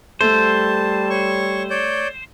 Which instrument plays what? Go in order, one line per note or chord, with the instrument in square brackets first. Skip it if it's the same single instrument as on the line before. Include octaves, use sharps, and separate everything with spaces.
[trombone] G3 [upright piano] A3 [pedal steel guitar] C5 [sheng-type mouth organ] A5
[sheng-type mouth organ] C#5 C#6
C#5 D5 G6